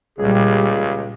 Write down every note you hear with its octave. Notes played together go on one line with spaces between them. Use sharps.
C#2 A#2 G3 G#4